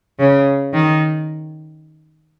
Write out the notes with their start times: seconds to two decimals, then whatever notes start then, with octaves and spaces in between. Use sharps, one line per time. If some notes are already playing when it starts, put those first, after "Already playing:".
0.20 C#3
0.73 D#3